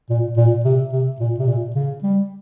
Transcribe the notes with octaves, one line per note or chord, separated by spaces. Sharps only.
A#2
A#2
C3
C3
A#2
C3
A#2
C#3
G3